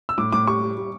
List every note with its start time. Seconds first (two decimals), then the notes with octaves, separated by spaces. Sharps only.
0.09 E6
0.18 A2 D6
0.32 A2 D6
0.47 G3 C#6
0.62 G3
0.77 G3